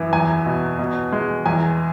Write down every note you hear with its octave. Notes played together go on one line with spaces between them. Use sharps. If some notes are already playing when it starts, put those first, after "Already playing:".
Already playing: F#2 E3
E2 G#5
B2
B2
G#3
E2 G#5